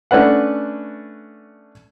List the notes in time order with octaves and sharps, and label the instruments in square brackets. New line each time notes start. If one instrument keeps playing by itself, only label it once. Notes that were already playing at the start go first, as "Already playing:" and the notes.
[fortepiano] A3 C#4 D4 B4 F#5